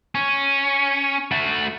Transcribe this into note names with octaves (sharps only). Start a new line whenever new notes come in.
C#4
A3 F#4